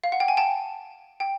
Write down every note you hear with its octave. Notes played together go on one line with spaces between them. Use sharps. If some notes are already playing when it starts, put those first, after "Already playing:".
F5
F#5
G5
G#5
G5 A5
G5